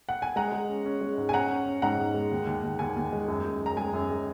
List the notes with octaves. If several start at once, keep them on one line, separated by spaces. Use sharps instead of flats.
F#5
G#5
G#3 F#5 A#5
G#3
C#4
C#4
G#3
G#2
G#5
C#4 F#5 A#5
C#4
C#4
G#2 F#5 A#5
G#2
G#3
D#2
D#2
D#2
D#2 G#5
D#2
G#3
F#2
F#2
F#2 A#5
G#3 G#5
F#2
G#3